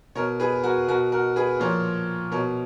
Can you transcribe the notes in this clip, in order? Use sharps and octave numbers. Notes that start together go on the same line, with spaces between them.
B2 A#4 C#5
G#4 B4
F#4 A#4
B2 F#4 A#4
F#4 A#4
G#4 B4
A#2 F3 A#4 C#5
B2 A#4 C#5